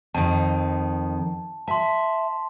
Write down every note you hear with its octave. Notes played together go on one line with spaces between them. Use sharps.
F2 D#3 A5
E5 A5 C6